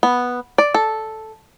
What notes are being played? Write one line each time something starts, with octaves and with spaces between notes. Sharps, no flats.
B3
D5
A4